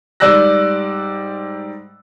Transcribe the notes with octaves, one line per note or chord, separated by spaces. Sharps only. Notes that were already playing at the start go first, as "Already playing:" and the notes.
G#2 G3 D5 E6 F#6 A#6